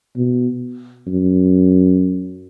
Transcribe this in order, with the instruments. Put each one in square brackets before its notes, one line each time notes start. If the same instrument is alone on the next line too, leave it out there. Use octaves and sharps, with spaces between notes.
[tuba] B2
F#2